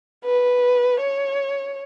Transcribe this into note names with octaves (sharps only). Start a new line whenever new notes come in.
B4
C#5